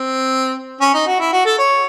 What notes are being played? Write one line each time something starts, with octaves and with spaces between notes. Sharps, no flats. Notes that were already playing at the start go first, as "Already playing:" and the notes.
Already playing: C4
C#4
D#4
F#4
E4
F#4
A4
C#5